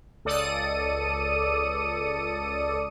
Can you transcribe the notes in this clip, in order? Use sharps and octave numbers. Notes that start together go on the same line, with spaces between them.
C#2 A4 D5 D#6 C#7 D#7